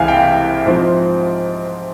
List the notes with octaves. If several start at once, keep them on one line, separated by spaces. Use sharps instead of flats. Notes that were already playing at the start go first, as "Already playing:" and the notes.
Already playing: C2 C3 E3 G#3 E4 F5 G#5
G5
G#2 F3 C4